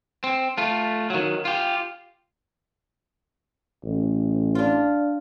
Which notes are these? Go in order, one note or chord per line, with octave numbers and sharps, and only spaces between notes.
C4
A3 F4
D#3 F#3
F4 G4
A1
D4 F4